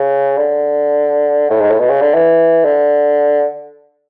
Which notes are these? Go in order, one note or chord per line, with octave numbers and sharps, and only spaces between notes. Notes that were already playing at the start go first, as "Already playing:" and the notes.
Already playing: C#3
D3
A2
G#2
A2
B2
C#3
D3
E3
D3